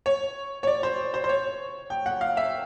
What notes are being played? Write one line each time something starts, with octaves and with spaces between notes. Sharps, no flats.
C#5
C#5
D5
C5
C5
C5
C#5
G5
F#5
F5
E5